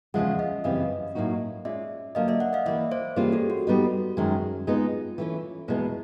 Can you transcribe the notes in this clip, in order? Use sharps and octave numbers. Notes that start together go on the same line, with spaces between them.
E2 C#3 F3 G#3 E5 F#5
D#5 F5
F#2 C#3 E3 G3 C4 D#5 F5
A2 F#3 A#3 D#4 F#4
G#3 C#4 F4 D5 E5
D3 F#3 A#3 D#5 F5
D5 E5
E5 F#5
D#5 F5
E3 G3 A#3 D5 E5
C5 D5
E3 G3 A#3 C#4 F4 G#4
G4 A4
F#4
G3 B3 D#4
F#2 D#3 G#3
G#3 B3 D#4 F4
E3 A3 C#4
E2 B2 G#3 B3 E4